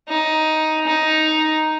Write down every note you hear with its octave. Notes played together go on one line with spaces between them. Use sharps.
D#4
D#4